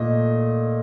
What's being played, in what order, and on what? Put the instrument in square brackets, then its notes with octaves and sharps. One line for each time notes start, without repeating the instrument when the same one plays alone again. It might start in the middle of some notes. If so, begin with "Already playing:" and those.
Already playing: [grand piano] A#2 A3 D#5